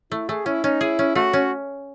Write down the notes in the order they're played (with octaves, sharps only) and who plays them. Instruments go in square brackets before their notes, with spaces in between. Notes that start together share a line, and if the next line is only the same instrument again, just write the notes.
[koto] A3 [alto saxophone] E4
[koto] A3 [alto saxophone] G#4
[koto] C#4 [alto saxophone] E4
[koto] C#4 [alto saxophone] D#4
[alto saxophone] E4 [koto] G#4
[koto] C#4
[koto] A3 [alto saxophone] F#4
[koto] C#4